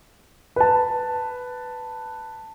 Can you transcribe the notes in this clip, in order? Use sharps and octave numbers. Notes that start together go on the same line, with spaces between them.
B4 A5